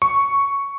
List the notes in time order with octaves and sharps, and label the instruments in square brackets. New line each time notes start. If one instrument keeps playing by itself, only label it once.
[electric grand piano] C#6